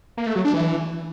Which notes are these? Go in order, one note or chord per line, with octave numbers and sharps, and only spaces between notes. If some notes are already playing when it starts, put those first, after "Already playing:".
A#3
A3
F#3
D4
E3